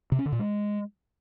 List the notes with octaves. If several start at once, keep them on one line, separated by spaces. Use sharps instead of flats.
C3
C#4
D3
A#2
G#3